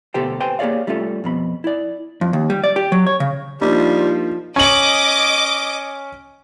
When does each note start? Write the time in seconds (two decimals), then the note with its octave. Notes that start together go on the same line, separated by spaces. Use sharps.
0.14 D2 B2 G4 A4 C5 G5
0.40 B4 C5 G5 G#5 C6
0.59 A#3 G4 G#4 C#5 D5 F5
0.87 G3 A3 C#4 F4 A4
1.24 F2 B2 B5
1.64 E4 D5
2.21 F2
2.33 D#2
2.50 G3
2.64 D5
2.76 G4
2.92 F#3
3.07 C#5
3.20 C#3
3.62 F3 G3 A#3 D4 D#4
4.56 C#4 D#5 D6 F#7